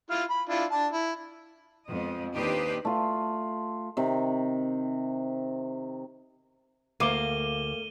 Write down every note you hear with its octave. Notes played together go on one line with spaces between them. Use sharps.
E4 F4 F6
B5
D4 E4 F4
D4 A5
E4
F2 G#3 B3 D#5
D#2 D4 G4 B4 C5 D#5
A3 F4
C3 D#3
D2 A#3 F5 D6 C7 D#7 E7 G7